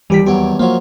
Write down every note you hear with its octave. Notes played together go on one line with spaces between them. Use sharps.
D#2 E3 G3 G4 B6
E2 F#3 G4
F3 F#3 A#3 C#5